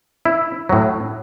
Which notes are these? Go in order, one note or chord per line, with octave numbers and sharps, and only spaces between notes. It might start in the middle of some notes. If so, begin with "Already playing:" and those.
E4
A2 F#3